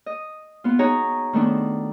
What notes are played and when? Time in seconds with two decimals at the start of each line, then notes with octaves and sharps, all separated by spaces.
0.06 D#5
0.64 B3 F4
0.79 D#4 F#4 G#4 C#5 A#5
1.33 D#3 A3 B3 D4